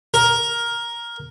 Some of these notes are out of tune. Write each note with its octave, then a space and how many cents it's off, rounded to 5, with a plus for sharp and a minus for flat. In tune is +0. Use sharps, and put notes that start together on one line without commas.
A#4 +10